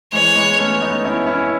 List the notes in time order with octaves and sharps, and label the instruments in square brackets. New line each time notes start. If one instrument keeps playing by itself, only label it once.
[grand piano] E3 G#3 [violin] C#5
[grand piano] G#3 B3
A3 C#4
B3 D#4
C#4 E4
C#4 E4